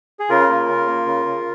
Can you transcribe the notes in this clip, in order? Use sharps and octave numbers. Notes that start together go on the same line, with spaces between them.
G#4
C#3 F4 A#4
A#3
C#3
A#3
C#3
C#3